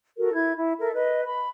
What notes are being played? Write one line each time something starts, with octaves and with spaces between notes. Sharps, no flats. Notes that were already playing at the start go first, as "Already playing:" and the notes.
F#4 A4 A#4
E4 G#6
E4
A4 A#4 E5
B4 D#5
B5